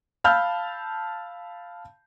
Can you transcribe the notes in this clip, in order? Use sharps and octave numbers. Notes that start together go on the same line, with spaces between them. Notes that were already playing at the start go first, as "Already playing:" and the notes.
F5 A5 B5 E6 F6 G6